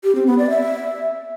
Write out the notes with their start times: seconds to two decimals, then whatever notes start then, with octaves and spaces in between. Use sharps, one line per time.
0.04 G4
0.15 C4
0.27 B3
0.38 D5
0.50 E5